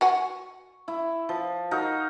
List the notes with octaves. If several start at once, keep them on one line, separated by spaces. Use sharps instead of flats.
F#4 F#5 G#5 C#6
E4
F3
D#4 F#4 A#4